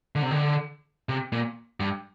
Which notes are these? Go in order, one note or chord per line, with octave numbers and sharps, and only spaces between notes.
D3
C3
D3
C3
A#2
G2